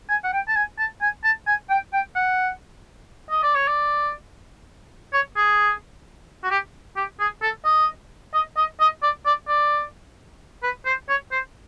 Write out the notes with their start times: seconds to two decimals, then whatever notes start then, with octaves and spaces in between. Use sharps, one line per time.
0.09 G#5
0.24 F#5
0.33 G5
0.48 A5
0.56 G#5
0.78 A5
1.01 G#5
1.24 A5
1.47 G#5
1.70 G5
1.93 G5
2.15 F#5
3.30 D#5
3.43 D5
3.55 C#5
3.68 D5
5.13 C#5
5.36 G#4
6.44 F#4
6.51 G4
6.97 G4
7.20 G#4
7.42 A4
7.65 D#5
8.34 D#5
8.57 D#5
8.80 D#5
9.02 D5
9.26 D5
9.48 D5
10.63 B4
10.86 C5
11.09 C#5
11.32 C5